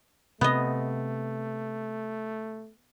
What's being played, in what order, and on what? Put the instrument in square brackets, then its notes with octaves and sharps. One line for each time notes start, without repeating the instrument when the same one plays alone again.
[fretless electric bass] C3 [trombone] A3 [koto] B3 D#5